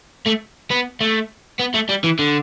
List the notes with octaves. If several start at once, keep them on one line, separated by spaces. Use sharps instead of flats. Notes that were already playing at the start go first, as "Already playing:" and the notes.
A3
B3
A3
B3
A3
G3
E3
D3